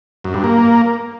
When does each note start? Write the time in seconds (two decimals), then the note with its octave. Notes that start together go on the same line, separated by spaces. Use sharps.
0.24 F#2
0.34 G2
0.44 A#3